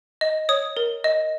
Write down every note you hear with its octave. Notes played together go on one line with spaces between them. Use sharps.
D#5
C#5 D#6
A#4
D#5